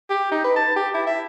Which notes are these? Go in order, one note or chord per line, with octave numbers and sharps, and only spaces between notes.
G4
D#4
B4
A5
G4
E4
E5